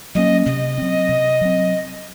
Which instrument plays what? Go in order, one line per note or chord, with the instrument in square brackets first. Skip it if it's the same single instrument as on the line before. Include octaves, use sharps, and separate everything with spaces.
[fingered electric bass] F#3 A#3 C#4 [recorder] D#5
[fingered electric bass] C3 [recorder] D#5
[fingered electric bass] F#3 C4
C3
F#3 C4